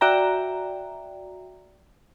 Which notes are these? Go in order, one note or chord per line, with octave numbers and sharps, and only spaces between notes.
F#4 D5 E5 G5 A#5